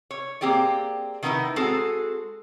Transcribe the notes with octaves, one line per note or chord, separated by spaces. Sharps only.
C#5
A#3 C4 G4 G#4 D5
D#3 G#3 B3 C4 D#4 E4
G#3 C4 F#4 G#4 A4